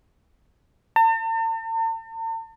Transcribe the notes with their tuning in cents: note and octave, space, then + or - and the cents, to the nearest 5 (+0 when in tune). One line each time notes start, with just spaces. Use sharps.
A5 +45